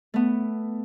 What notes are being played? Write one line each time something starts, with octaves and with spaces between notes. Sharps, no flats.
A3 B3